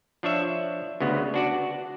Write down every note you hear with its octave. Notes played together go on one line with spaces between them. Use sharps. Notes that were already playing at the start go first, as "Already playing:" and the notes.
F3 D4 C#5 E5
D2 C#3 B3
D4 F#4 D5